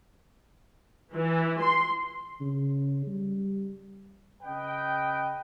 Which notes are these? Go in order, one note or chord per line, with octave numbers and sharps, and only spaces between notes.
E3
C6
C#3
G3
C#3 B4 D#5 G5